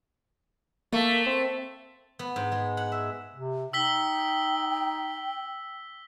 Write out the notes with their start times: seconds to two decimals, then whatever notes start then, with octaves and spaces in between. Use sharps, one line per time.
0.92 A3 A#3
1.26 C4
2.19 B3
2.36 G#2
2.52 G#3
2.77 F#5
2.92 E5
3.33 C3
3.73 D#4 G5 E6 B6 G7